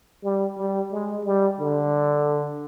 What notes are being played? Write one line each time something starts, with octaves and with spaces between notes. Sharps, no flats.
G3
G3
G#3
G3
D3